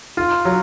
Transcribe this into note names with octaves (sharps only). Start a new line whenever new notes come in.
F4
F#3